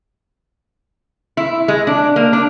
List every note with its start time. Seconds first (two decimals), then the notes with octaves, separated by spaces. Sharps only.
1.37 E4
1.68 G#3
1.87 D4
2.16 A#3
2.33 D4